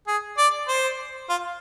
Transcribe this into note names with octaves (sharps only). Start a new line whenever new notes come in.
G#4
D5
C5
F4